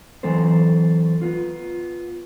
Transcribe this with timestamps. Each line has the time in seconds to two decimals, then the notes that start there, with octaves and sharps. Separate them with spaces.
0.23 E3 F#3 C4 A4 C5
1.21 B3 F4